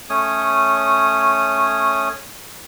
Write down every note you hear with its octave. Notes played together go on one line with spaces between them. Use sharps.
A3 C#4 C#5 D#6